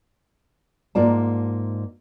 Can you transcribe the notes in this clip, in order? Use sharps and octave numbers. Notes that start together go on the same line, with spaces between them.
G#2 A#3 F4 D5 A5